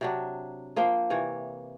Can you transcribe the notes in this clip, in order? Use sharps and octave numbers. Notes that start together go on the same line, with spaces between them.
C3 F#3 D4
F3 A#3 C5 G5
C3 E3 C#5